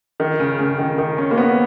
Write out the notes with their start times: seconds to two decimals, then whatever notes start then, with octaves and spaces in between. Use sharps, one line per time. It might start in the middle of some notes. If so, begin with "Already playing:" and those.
0.20 D#3
0.40 C#3
0.59 C#3
0.78 D#3
0.98 D#3
1.18 C#4
1.31 A#3
1.38 B3